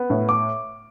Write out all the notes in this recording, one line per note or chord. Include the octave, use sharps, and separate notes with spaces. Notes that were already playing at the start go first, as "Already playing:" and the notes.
Already playing: B3
A2
D6